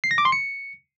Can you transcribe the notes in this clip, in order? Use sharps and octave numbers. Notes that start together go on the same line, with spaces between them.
C7
A#6
D6
C6
C#7